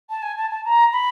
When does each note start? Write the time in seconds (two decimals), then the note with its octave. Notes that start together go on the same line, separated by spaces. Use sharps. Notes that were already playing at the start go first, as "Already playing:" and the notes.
0.10 A5
0.22 G#5
0.37 A5
0.50 A5
0.65 A#5
0.93 B5